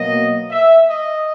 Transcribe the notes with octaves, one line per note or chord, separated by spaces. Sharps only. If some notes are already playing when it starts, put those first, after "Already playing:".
Already playing: B2 F#3 A#3 D#5
E5
D#5